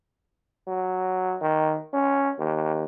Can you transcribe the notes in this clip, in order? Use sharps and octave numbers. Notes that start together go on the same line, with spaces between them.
F#3
D#3
C#4
D#2